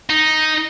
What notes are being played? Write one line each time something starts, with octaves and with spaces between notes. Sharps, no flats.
D#4